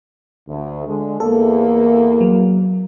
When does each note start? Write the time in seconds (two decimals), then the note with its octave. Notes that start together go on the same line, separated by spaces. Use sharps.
0.49 D2
0.87 D3 G#3
1.20 E2 A#3 A4
2.21 F#3